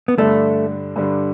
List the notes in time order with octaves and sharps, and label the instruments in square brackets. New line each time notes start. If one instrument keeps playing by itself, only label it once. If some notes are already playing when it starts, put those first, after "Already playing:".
[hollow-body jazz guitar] B3
[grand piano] G2 D3 G3 D4 [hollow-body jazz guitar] A3
[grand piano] G2 D3 G3 D4